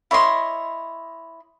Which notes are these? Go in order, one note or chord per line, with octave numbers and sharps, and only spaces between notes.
E4 C#5 D#5 C6